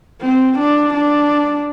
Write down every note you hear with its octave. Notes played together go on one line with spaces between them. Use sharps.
C4
D4
D4